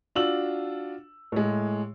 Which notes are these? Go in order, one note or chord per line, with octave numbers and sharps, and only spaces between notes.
D4 F4 F#4 E6 F#7
A2 G#3